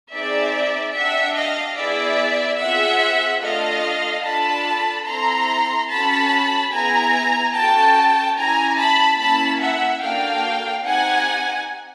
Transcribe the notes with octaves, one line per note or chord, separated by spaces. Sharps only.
C4 D#4 G#4 D5 E5
D4 G4 E5 F#5
D#5 F5
B3 E4 G#4 D5 E5
C4 F4 G#4 E5 F#5
A3 D4 F4 A4 D#5 F5
D4 F4 A4 A5 B5
C4 E4 A4 A#5 C6
C#4 F#4 A4 A5 B5
B3 E4 G#4 G#5 A#5
C#4 F#4 A4 G5 A5
C#4 E4 G4 G#5 A#5
A5 B5
A#3 C#4 E4 A5 B5
E5 F#5
A#3 D4 F#4 A4 F5 G5
C4 D#4 G4 F#5 G#5